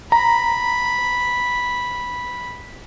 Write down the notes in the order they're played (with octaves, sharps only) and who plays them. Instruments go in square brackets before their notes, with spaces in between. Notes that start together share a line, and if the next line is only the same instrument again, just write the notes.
[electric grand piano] A#5 [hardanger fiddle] B5